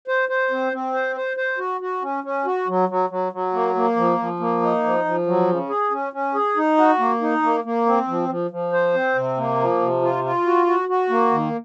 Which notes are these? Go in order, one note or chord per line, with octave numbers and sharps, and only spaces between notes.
C5
C5
C4
C4
C5
C5
C5
F#4
F#4
C#4
C#4
F#4
F#3
F#3
F#3
F#3
A#3
A#3
F3
F3
A#3
D#4
F3
F3
F#3
C#3
G#4
C#4
C#4
G#4
D#4
F#4
A#3
D#4
A#3
A#3
C4
F3
F3
F3
C5
C4
C3
A#3
F3
C3
F4
F4
F#4
F#4
F#4
A#3
D#3